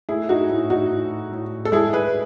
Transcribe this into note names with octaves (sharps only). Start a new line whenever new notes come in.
A3 E4 G#4
D#4 F#4
A2 E4
D#4 F#4
A2
A2
A4
G#3 E4 G#4
G#4 B4